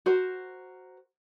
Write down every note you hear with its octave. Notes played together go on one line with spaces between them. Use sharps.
F#4 A#4 C5